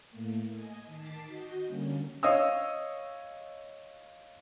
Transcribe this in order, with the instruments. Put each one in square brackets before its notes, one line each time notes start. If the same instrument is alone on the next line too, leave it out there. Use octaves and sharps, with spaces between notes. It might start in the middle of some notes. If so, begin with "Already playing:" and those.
[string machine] A2 A3 A#3
D#5 G#5
D#3 A5 D6 B6 C7
F#4 D#5 G6
D3 G3 A#3 C#4
[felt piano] C#5 D#5 F5 D#6 E6